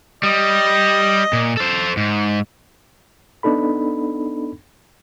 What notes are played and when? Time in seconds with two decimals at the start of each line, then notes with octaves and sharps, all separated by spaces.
0.23 G3 D#5
1.33 A#2
1.57 A4 C5
1.97 G#2
3.43 B3 D4 D#4 A4 B5